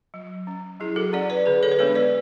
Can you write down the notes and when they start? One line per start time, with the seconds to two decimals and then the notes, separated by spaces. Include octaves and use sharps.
0.14 F#3
0.47 C#4
0.80 F#3 E4 G#4
0.96 F#4 A4
1.13 C#4 D5 F#5
1.30 B4 D5
1.46 D3 G#4 B4
1.63 A4 C#5
1.71 B4
1.79 G#3 B3 D4 A4 C#5
1.95 B4 D5